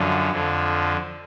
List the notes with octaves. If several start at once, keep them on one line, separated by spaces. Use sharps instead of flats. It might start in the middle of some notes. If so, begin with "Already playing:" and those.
Already playing: F#2 D3 F3
F2 D3 F3